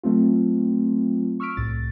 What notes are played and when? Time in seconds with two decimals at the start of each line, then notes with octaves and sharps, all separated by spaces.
0.03 F#3 A3 C4 F4
1.40 C#6 E6 F6 B6 D7
1.57 C2 A2 A6